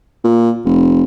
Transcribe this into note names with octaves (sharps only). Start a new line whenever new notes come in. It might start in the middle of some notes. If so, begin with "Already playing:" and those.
A#2
F1